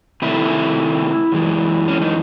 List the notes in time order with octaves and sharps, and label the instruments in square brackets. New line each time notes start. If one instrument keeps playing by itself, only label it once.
[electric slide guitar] C3 D#3 A3 E4
F#2 E3 G#3
C#4
D#4